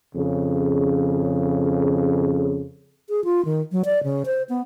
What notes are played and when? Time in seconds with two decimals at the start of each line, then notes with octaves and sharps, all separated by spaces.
0.15 F2 C#3
3.09 G#4
3.24 F4
3.45 D#3
3.72 F#3
3.85 D5
4.03 C#3
4.26 C5
4.49 B3